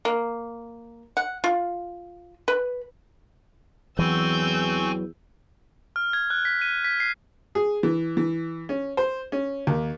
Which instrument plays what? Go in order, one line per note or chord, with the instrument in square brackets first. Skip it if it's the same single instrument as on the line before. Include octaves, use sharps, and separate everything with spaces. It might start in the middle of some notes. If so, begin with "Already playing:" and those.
[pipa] A#3
F#5
F4
B4
[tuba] E2 [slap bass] E3 F#3 [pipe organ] C4 G#5 C#6 [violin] E6 G6
[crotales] F6
G#6
F#6
B6
D#7
B6
C7
[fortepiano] G#4
E3
E3
C#4
C5
C#4
D#2